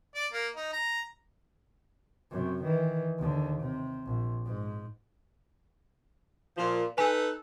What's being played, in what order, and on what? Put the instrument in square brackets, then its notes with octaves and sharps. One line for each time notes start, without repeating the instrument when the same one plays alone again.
[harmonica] D5
A#3
D#4
A#5
[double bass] F#2 C3
D#3 E3
D#2 D3
C3
A#1
G#2
[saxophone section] A#2 F3
[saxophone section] D#4 A4 B4 [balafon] G#5